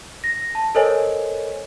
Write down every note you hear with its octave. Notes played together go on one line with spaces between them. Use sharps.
A#6
A5
A4 A#4 C5 C#5 D#5 G#5